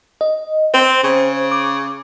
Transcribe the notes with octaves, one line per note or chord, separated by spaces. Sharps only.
D#5
C4 C5
C#3
D6